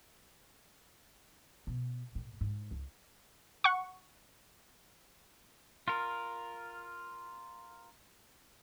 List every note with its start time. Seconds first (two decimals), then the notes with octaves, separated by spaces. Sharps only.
1.67 B2
2.15 A2
2.41 G#2
2.71 C#2
3.64 F#5 C#6
5.88 F4 A#4